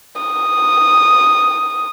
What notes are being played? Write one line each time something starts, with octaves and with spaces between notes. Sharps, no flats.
D#6